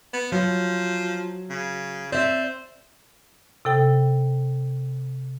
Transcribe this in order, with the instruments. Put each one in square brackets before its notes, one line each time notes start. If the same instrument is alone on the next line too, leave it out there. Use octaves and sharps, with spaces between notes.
[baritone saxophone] B3
[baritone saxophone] F3 [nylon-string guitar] F#3
[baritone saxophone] C#3
[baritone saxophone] C4 [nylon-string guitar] D5 E5
[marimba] C3 A4 G5